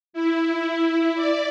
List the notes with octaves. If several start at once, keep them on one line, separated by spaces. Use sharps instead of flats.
E4
E4
D5